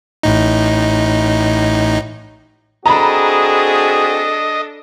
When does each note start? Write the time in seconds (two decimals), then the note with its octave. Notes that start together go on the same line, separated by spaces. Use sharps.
0.23 A1 A2 D#4
2.86 C4 D4 F#4 G#4 A4 D#5 A#5 B5